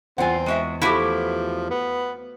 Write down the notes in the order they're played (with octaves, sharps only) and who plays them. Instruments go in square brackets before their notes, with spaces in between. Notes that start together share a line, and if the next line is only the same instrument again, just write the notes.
[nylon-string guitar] E2 G#5 [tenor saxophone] C4 [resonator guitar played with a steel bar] F4 F#5
[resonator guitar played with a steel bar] G#3 F#4 E5
[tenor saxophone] F3 [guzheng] A3 F#4 B4 [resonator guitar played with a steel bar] E4 G4
[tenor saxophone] B3